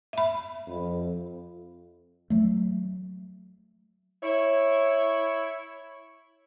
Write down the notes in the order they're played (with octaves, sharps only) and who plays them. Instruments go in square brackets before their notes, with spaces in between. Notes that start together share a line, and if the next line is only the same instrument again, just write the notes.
[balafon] E5 B5
[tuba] F2
[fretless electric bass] F#3 A3
[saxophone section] E4 C#5